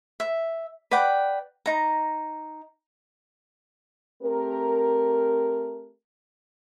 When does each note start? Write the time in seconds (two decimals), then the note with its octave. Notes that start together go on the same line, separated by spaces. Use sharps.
0.20 E5
0.91 B4 D5 F#5 G5
1.66 D#4 A#5
4.23 A3 C4 G4 A#4